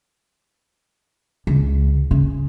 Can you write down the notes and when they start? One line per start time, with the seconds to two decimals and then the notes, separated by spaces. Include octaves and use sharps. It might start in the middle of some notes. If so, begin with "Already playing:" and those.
1.47 C#2
2.11 C#3